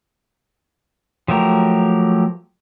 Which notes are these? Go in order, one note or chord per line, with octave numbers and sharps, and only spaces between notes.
F3 F#3 A3 G4 A#4